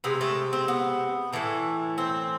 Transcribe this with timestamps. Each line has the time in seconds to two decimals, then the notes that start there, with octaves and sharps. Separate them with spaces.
0.04 C3 G#3 B3
0.21 A3
0.53 C4
0.68 B3
1.33 A2 E3 A3
1.98 C4